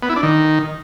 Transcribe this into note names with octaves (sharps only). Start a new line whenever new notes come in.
B3
E4
D4
D#3